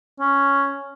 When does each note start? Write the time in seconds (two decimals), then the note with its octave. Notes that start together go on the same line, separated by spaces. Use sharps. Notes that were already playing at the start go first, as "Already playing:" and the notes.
0.20 C#4